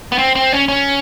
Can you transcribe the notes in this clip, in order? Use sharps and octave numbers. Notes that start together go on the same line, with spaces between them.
B3
C4
C4
C#4
C#4